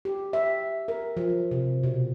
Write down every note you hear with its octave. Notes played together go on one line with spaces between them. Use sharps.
G4
E5
A#4
F3
C3
B2